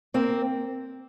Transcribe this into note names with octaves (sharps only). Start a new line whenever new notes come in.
A#3 C4